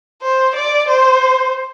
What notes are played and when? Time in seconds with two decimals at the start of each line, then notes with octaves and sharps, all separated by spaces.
0.22 C5
0.56 D5
0.89 C5